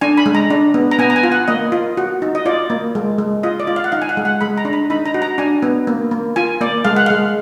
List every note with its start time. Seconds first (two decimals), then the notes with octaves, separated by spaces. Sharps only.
0.01 D4 G#5
0.17 B5
0.26 G#3
0.35 A#5
0.50 D4
0.74 B3
0.91 A#5
0.99 B3 G#5
1.10 A#5
1.16 G#5
1.23 F4
1.32 F#5
1.48 A#3 D#5
1.72 F4
1.97 F#4
2.22 D#4
2.35 D#5
2.46 F4 D5
2.70 A#3
2.95 G#3
3.18 G#3
3.43 F4 D#5
3.60 D5
3.67 F4
3.76 F5
3.84 F#5
3.92 D#4 F5
4.02 G#5
4.09 F#5
4.17 G#3
4.25 F#5
4.41 G#3 B5
4.58 A#5
4.65 D4
4.73 B5
4.90 D#4 B5
5.06 A#5
5.14 F#4
5.22 A#5
5.38 D4 G#5
5.63 B3
5.87 A#3
6.11 A#3
6.36 F4 G#5
6.61 A#3 D5
6.85 G#3 F5
6.97 F#5
7.06 G#3 F5